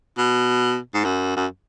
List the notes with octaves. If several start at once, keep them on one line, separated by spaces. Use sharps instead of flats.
B2
G#2
F#2
F#2